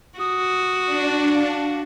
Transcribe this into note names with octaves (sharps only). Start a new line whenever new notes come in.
F#4 D#6
D4
F5